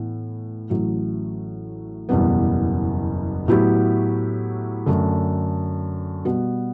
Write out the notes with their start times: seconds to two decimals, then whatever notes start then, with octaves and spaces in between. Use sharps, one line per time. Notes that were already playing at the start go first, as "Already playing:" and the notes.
Already playing: A2 E3 B3
0.70 A1 A2 F#3
2.09 F#1 E2 B2 G3 B3
3.48 A2 F#3 B3 E4 G4
4.86 F#2 D3 A3 D4
6.25 B2 G3 B3 F#4